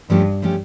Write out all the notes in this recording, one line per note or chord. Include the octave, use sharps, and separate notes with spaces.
G2 F3 A3 C#4 G4
F3 A3 C#4 G4